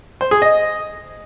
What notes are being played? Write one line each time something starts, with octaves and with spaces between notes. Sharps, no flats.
C5
G#4
D#5